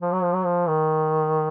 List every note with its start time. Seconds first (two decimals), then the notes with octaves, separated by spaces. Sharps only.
0.01 F3
0.12 F#3
0.23 F3
0.33 F#3
0.45 F3
0.68 D#3